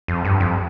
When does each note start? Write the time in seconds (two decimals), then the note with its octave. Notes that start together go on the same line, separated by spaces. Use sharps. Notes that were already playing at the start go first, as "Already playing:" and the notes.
0.08 F2
0.25 G2
0.40 F2